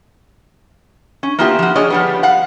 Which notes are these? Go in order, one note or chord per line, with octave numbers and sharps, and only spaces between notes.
C#4
A#3 B3 E4 F4 G4
F3 F#4
D4 G#4 C#5 D#5
F3 G3 B3
F5 F#5